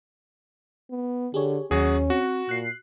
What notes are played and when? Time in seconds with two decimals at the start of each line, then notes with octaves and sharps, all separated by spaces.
0.90 B3
1.34 D3 G4 G#4 C#5
1.71 D#2 F#3 C#4 F#4 G#4
2.10 C4 F#4
2.49 A#2 F#6 C7